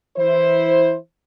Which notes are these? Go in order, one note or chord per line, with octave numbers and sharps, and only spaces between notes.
E3 E4 C5